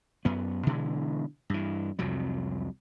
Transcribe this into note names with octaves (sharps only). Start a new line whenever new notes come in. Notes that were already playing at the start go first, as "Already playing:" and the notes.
F#2 B3
B2 D3 E3 G#3
G2 E3
C2 F2 C3 F#3